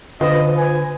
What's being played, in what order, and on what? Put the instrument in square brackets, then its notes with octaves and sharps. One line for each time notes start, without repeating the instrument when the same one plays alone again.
[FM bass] D3 [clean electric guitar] F4 C5 [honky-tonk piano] B4 [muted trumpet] D#5
[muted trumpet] G#5